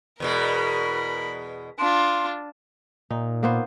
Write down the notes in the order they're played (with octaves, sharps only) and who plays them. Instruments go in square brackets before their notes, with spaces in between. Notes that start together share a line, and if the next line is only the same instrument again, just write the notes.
[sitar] E2 B2 G#3 [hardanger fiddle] A#4 B5
[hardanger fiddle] D4 F4 [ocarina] C6
[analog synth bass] A#2 [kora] D#4
[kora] A#3 B3 C5